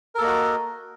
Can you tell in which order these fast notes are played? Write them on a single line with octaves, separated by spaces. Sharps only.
A#4 A4 A#3 D#5 F#4